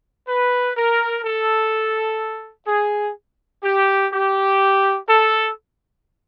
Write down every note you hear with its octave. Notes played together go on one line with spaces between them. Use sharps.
B4
A#4
A4
G#4
G4
G4
A4